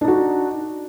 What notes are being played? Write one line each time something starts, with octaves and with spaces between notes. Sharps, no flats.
D4 D#4 F#4